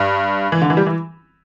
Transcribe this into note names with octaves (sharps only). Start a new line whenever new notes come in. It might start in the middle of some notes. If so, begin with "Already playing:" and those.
Already playing: G2
E3
D3
E3
G3
E3